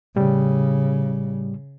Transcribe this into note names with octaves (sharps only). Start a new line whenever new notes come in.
A2 C#3 G3